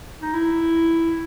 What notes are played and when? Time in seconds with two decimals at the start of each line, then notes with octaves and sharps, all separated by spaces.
0.22 D#4
0.34 E4